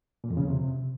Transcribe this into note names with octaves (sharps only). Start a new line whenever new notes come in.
A#2
F2
C#3
E2
C3